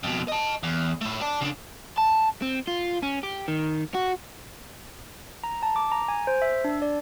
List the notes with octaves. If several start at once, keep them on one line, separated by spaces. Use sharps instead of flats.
F2 B2
D#5 A5
E2
A3 E4
D5 A5
C#3 D4
A5
C4
F4
C#4
G4
D#3
F#4
A#5
A5
D6
A#5
G#5
C5
E5
D4
D5